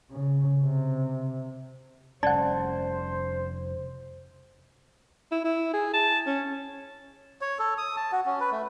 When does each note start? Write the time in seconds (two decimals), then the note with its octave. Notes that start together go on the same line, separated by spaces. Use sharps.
0.11 C#3
0.64 C3
2.23 F1 G3 C#4 C5 D5 F#5 A5
5.31 E4
5.45 E4
5.74 G#4
5.93 A5
6.27 C#4
7.41 C#5
7.59 A4
7.78 D#6
7.97 A5
8.12 F#4
8.26 C#4
8.40 B4
8.52 A3